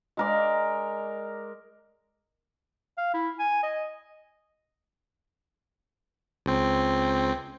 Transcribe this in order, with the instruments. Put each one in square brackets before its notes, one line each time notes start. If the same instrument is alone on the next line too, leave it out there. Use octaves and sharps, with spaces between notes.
[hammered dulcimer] G#3 A#4 D5
[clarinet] F5
E4
G#5
D#5
[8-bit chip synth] C#2 C4